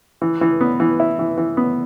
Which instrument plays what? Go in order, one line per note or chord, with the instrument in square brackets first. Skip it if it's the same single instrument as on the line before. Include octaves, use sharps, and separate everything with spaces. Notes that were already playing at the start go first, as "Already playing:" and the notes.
[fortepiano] E3
E3
B3
E3
E4
E3
E3
B3